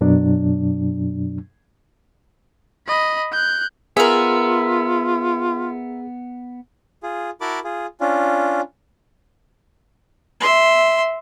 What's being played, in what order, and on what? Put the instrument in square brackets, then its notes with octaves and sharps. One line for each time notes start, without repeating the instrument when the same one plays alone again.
[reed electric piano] F#2 B2 F#3 D4
[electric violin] D#5 B5
F#6 G6
[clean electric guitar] B3 [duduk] F4 [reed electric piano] G#4 [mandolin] A#4 E5
[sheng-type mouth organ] F4 G#4
E4 F#4 A#4 A5 B5 D6
F4 G#4
C#4 D4 F4
[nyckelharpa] E5 C6